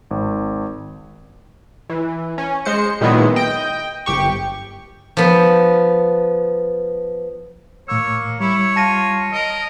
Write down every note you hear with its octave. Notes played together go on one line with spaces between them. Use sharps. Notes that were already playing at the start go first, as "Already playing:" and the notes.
G#1
E3
C#4
G#3 C5 C#7
A#2 D#3 F#3 G#3 B3 E4
D#5 G5
G1 G4 C#6
F3 B3
A2 A#3 C#5 E6
G3 E4 C#5
F4 A5 A#6 D#7
A#4 D#5